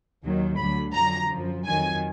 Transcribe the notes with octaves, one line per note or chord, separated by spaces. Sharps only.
D#2 D#3 F#3
D2 D3 F#3 B5
F2 D3 F#3 A#5
F#2 F3
F2 D#3 F#3 G#5